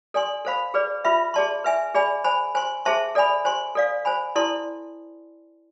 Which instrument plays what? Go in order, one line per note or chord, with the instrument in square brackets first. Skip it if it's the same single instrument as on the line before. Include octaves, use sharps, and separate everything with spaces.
[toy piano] A4 D5 G#5 C6
A4 C5 F5 B5
G#4 B4 D5
F4 B4 E5 B5
G#4 D5 A5 C6
B4 E5 G#5
G#4 D5 G#5 B5
C5 G#5 B5
C5 G#5 C6
G#4 C5 E5 A5 C6
A4 D5 G#5 B5
C5 G#5 C6
A4 D5 F5
C5 G#5 B5
E4 A4 D5 A5 C6